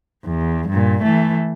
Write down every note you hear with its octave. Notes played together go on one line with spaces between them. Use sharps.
E2
G2 A#2
E3 A3